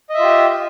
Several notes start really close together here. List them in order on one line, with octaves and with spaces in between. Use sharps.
D#5 E5 F4 G4